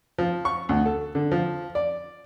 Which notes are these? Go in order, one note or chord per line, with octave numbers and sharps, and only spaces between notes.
F3
C#6
D2
A4
D3
F3
D5